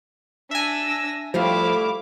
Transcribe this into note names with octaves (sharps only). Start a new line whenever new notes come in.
D4 E5 G#5 E6 A#6
F3 G3 A3 E4 C5 F5 D6